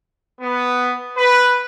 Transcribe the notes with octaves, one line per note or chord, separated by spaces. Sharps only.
B3
B4